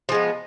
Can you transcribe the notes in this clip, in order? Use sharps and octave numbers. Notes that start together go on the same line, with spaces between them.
F3 G#3 B3